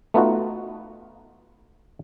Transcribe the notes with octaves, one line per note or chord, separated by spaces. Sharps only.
A3 B3 D#4 F4 F#4